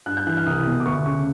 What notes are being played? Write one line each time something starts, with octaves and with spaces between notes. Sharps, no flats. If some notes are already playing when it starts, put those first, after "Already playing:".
G2 F#6
G6
E3 F#6
F6
C2 D#6
B2
D6
D2 C#6
C#3 C#6